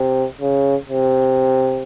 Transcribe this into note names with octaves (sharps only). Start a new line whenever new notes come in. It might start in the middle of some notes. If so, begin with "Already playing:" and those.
Already playing: C3
C#3
C3